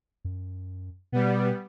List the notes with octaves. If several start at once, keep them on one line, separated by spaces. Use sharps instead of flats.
F#2
B2 G3 B3